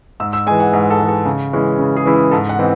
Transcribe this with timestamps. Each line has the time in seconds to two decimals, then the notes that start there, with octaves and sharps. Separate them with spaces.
0.20 G#2 E6
0.33 E6
0.47 G#3 G#5
0.51 E3
0.60 F#5
0.73 G#2
0.90 A4
1.00 E3 G#3
1.08 A4
1.26 C#3
1.53 E3 G#3 C#4 E4
1.79 C#3
1.97 G#4
2.05 E3 G#3 C#4 E4
2.14 G#4
2.31 G#2 A4
2.49 F#5
2.59 E3 C4 D#4